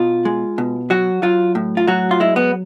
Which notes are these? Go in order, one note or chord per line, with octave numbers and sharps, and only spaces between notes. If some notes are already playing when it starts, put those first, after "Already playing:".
Already playing: B2 F4
G#3
B2
F#3 F#4
F#3 F4
A2
F4
F#3 F#4
F4
G#3 E4
B3